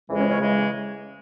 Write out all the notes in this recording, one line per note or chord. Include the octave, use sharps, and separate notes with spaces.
F2 C#3 E3 G#3
C#4 C#5
C#4 C#5
C#3 E3 G#3